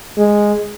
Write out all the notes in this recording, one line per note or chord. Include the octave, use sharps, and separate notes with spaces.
G#3